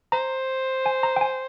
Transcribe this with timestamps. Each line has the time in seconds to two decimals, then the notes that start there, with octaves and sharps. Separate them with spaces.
0.12 C5 A#5
0.86 G#5
1.03 A#5
1.16 G5
1.21 G#5